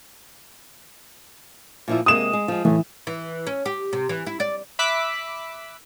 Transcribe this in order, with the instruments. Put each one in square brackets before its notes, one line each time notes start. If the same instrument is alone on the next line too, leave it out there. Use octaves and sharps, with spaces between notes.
[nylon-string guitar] A#2 F3 E4
[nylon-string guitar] C3 G#3 A#3 [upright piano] D#6 E7
[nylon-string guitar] G#3
F3 G#3
[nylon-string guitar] A2 [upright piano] E3
[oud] E3
C#4
G4
C3
E3
E4
D5
[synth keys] E5 B5 D6 E6 F#6 B6